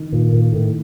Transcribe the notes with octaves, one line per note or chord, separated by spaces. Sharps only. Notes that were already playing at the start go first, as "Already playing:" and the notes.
Already playing: D#3
A#2
A#2
A2